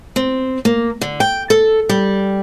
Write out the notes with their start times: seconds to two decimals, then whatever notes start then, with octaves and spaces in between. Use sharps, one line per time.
0.16 C4
0.65 A#3
1.01 D3
1.20 G5
1.50 A4
1.89 G3